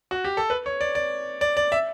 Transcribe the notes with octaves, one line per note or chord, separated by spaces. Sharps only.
F#4
G4
A4
B4
C#5
D5
D5
D5
D5
E5